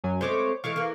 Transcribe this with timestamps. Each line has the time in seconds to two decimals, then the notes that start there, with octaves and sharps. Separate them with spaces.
0.04 F#2 F#3 G#5
0.21 G#3 A3 C4 C5 C#5 D6
0.64 E3 G#3 A3 F5 C#6 D6
0.76 E3 A#3